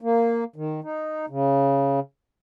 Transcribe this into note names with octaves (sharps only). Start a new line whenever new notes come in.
A#3
D#3
D#4
C#3